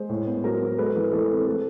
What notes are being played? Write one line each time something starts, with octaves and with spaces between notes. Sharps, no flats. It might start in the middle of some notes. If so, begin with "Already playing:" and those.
Already playing: G#3 C5
A2
B3
F#3 A#4 C5
B3
G#3 A4 B4
E3
E3 A4
C4
A3 A4